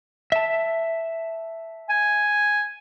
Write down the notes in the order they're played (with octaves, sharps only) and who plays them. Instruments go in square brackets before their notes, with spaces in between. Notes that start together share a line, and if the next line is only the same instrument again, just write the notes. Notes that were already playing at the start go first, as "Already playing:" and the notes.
[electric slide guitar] E5 A5
[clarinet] G#5